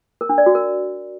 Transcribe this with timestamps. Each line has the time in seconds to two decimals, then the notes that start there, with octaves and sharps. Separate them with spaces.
0.21 A#4
0.29 D4
0.38 D5
0.46 F#4
0.55 A#4